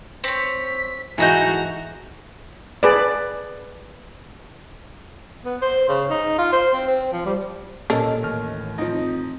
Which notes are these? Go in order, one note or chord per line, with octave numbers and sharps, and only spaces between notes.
C4 C#5 B6
G#2 E3 F#4 A4 D#5 A#5 G6
G#4 B4 D5
B3
C5
C#3
D#4
F4
C5
C4
C4
F3
G3
A#2 A#3 C#4 A4 A#4 D#5
A1 D#2 F6
F3 C4 D#4